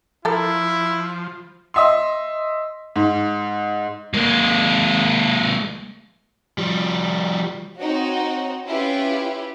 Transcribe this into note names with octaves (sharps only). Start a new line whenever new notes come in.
F3 E4 A4 A#4
D#5 E5 C6
G#2
G#3 A#3
F3 G3
C4 D#4 F#4 C#5
C#4 E4 F4 G4 B4